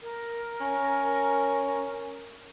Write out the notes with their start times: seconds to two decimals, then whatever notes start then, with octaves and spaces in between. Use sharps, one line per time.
0.01 A#4
0.61 C#4